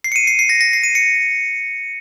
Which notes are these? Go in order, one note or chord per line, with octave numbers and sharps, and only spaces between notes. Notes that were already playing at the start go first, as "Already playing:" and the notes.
C7
C#7
D#7
C7
C7
A#6
A#6
C7
D#7
C#7